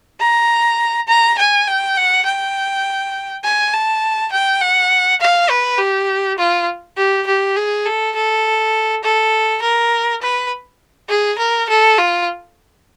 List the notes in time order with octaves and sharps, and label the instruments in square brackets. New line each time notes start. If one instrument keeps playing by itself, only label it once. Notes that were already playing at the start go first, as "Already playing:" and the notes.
[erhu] A#5
A#5
G#5
G5
F#5
G5
G#5
A5
G5
F#5
F5
B4
G4
F4
G4
G4
G#4
A4
A4
A4
A#4
B4
G#4
A#4
A4
F4